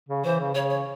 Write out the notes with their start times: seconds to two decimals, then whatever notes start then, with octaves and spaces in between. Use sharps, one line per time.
0.09 C#3
0.24 E3 C5
0.39 C#3
0.54 C#3 C#5
0.70 C#5